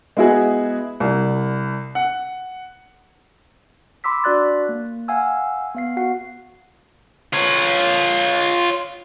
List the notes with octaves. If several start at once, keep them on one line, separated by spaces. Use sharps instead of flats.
G#3 B3 E4 F#4 G#4
C2
F#5
B5 C6 D6 E6 B6
D4 F#4 D5 F#6 A6
A#3
F5 F#5 G#5 E6
B3 F5 C7
F#4 F5 F#5 C7
F4 C#5